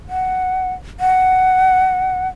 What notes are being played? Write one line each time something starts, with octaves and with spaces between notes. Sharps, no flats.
F#5
F#5